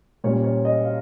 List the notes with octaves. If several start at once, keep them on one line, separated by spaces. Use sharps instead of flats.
A#2 G3 C#4 C#5
C#5
D#5
F5